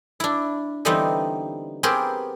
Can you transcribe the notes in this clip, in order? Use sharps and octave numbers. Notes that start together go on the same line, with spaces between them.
D4 E4
D3 E3 G3 B3 C4 D#4
B3 C4 G4 G#4 A#4